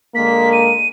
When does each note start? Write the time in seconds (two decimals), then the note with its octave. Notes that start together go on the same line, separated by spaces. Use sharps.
0.15 D3 G#3 A#3 B6
0.53 D#7